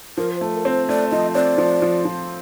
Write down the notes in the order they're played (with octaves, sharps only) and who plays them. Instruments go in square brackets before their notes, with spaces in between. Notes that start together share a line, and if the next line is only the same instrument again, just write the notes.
[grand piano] F3 [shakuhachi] A#4
[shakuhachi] C5
[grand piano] A3
[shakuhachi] A#4
[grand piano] C4
[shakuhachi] C5
[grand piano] A3 [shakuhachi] D5
[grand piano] F3 [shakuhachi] D#5
[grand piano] C4 [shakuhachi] D5
[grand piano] F3
F3
F3